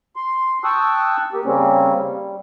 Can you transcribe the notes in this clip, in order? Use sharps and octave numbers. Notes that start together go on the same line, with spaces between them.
C6
G5 A5 C#6 D#6 E6 F#6
A#3 G4
C#3 G3 A#3 C4 C#4
G3